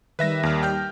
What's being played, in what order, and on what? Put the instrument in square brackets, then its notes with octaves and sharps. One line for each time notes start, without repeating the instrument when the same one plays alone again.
[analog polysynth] D#3 G3 [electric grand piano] B4 E5 A#6
[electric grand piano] D#2 F6
G5 F6 G6